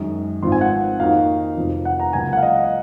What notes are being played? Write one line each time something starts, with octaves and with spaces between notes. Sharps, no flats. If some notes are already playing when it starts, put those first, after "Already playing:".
Already playing: F#2 D#3 G#3
G#1 G#2 F3 C4 F4 C6
G#5
F#5
F2 D#3 A#3 D#4 F#4 F5
F1 F2 D#3
F#5
A#5
C#2 C#3 F#3 A#3 G#5
F#5
F5
D#5